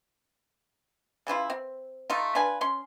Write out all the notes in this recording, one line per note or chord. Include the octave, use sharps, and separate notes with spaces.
C#3 E3 E4 F4
C4
A3 D#4 F4
D4 F4 B4 G#5
C#4 C6